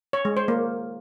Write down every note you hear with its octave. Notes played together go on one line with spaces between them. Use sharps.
C#5
G#3
C5
A#3